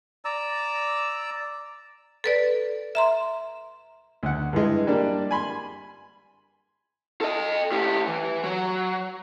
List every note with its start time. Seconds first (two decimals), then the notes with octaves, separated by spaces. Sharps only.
0.25 D5 A#5 E6
2.24 A4 B4 D5
2.95 E5 A#5 C6
4.23 D2 F#5
4.53 G2 E3 G#3
4.87 G3 A#3 D4
5.31 G#5 B5 C6
7.21 A4 D#5
7.72 A2 G4
8.07 E3
8.44 F#3